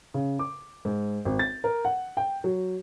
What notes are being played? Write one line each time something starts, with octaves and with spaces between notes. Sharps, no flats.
C#3
D6
G#2
G#1
A6
A#4
F#5
G5
F#3